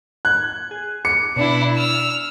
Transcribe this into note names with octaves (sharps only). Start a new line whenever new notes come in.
F#6 G#6
G#4
D6 C#7
B2 D4 E4
E6 F6